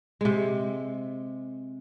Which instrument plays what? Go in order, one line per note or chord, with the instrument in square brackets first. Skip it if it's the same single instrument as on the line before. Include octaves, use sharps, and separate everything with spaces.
[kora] C3 G#3